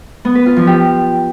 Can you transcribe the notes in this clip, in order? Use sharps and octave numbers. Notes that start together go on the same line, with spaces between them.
B3
B4
F4
F3
G4